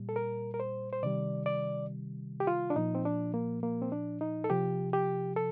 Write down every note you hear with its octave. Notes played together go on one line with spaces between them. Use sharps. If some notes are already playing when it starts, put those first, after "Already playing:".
Already playing: A#2 G3
A4
A#4
A#4
C5
C5
C3 D#3 G3 D5
D5
G4
F4
D4
A#2 F3 D#4
C4
D4
A#3
A#3
C4
D4
D#4
A4
C3 F3 G4
G4
A4